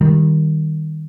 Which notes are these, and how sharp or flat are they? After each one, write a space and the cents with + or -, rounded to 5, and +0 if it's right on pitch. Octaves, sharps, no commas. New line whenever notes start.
D#3 +0 G3 +0